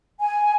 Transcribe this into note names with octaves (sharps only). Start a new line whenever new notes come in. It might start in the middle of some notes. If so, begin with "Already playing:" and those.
G#5